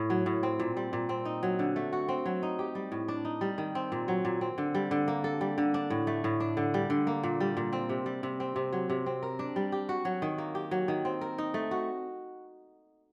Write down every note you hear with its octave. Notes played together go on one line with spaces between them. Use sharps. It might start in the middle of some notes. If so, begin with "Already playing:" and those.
Already playing: A2
F#3
A2
C4
A#2
G3
A#2
C4
D#4
F#3
D3
A3
F#4
C4
F#3
D#4
G4
G3
A2
D4
D#4
G3
D#3
C4
A#2
F#3
A#2
C4
D3
G3
D3
A#3
A4
G3
D3
D4
A2
A3
A2
D4
D3
G3
D3
A#3
A#2
G3
A#2
C4
C3
G3
C3
C4
C3
F#3
C3
C4
A#4
D4
G3
G4
F#4
F#3
D#3
A#3
G4
F#3
D#3
C4
A#4
D#4
A3
F#4